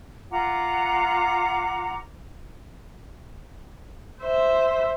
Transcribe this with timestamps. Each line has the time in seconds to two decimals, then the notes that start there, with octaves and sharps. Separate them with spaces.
0.31 F4 F#5 A#5 D6
4.22 C5 E5